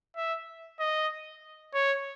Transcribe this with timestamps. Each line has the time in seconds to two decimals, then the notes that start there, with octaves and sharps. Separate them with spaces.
0.17 E5
0.80 D#5
1.74 C#5